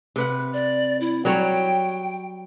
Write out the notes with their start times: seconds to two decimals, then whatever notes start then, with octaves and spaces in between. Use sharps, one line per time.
0.16 C3 B4 F#5
0.53 D5
1.01 E4
1.25 F#3 G3 C#5 G5